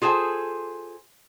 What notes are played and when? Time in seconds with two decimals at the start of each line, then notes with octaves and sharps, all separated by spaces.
0.02 F4 G#4 A4 C5 G#5